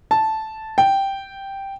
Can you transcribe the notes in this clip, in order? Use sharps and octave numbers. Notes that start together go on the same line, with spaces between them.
A5
G5